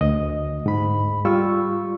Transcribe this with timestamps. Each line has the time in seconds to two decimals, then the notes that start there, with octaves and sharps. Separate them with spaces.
0.01 D2 D#5
0.66 G#2 B5
1.25 G3 F4 C#6 E6